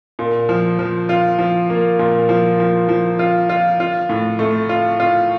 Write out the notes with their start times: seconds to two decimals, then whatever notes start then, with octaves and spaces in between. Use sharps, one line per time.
0.19 A#2
0.49 F3
0.79 F3
1.09 F4
1.39 F3
1.70 A#3
1.99 A#2
2.29 F3
2.60 F3
2.89 F3
3.19 F4
3.49 F4
3.80 F4
4.09 A2
4.39 A3
4.69 F4
5.00 F4